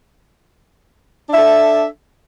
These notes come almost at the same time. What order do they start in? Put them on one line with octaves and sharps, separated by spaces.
D4 E5 A4